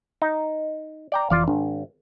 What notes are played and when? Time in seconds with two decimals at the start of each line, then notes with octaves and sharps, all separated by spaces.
0.22 D#4
1.12 D5 G5 A#5
1.30 F1 E3 F4 D5 F5
1.48 G#1 D4